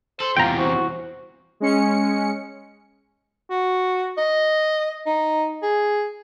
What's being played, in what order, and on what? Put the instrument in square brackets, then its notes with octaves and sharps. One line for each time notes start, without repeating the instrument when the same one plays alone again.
[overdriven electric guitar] A4 [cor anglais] C5 [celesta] F#7 G7
[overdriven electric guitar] E2 C3 [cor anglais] F4 [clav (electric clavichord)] G5 A#5
[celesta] E4 C5 [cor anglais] F#4
[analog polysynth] G#3 C#4 C#7
[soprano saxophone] F#4
D#5
D#4
G#4